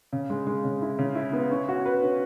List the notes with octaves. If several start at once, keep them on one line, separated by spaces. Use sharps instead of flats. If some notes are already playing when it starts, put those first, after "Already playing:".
C#3
G#3
G#3
C#3
E4
C#3
E4
B3
C#4
F#4
B4
C#4